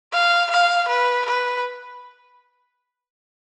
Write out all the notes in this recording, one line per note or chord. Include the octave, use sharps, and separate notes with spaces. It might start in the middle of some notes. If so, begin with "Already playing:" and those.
F5
F5
B4
B4